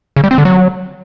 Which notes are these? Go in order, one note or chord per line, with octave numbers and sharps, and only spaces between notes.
C#3
G3
C4
D3
F#3